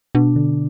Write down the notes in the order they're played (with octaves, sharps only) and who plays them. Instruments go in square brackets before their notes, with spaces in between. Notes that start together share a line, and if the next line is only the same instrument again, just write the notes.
[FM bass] B2 [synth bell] D4
[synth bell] D3